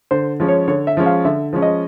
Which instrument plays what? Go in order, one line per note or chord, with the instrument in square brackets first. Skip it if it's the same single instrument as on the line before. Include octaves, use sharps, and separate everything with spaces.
[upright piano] D3 [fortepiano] C5
[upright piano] F3 G#3 C#4
[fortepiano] C#5
[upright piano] D3 [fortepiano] C#5
[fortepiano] E5
[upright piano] F3 G#3 C#4
[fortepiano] F5
[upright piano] D3 [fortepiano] E5
[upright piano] F3 G#3 C#4
[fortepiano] D#5